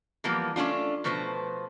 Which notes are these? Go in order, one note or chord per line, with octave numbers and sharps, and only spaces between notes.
E3 F3 G3 A#3 B3
A3 C#4 D4 F4
B2 F3 A3 B4 C5